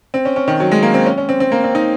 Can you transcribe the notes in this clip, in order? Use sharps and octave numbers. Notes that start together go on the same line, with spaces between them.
C4
C#4
C#4
D#3
F#3
G#3
A#3
C4
C#4
C#4
C4
C4
A#3
C4
D#4